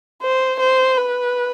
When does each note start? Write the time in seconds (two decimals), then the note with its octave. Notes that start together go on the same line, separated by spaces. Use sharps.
0.22 C5
0.60 C5
0.97 B4